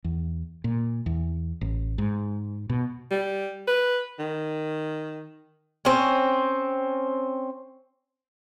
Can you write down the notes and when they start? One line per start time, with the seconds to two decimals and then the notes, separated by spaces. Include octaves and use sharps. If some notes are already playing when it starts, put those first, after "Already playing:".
0.04 E2
0.64 A#2
1.06 E2
1.61 A1
1.98 G#2
2.70 B2
3.11 G3
3.67 B4
4.19 D#3
5.85 C4 C#4